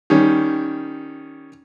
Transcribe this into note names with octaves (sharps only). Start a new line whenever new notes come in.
D#3 G3 C#4